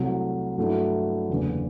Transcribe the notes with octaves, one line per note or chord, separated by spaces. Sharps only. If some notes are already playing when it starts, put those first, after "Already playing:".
Already playing: C2 C3 F#3 A3
G2 F#3 A3 E4
F#1 E2 D3